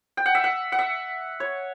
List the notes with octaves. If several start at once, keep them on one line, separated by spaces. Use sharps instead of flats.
G5
F#5
E5
F#5
F#5
E5
C#5